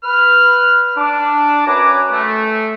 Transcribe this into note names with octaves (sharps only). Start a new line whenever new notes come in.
B4 F6
D4 D6
F#2 B4 C#5 G#5 A#5 D6
A3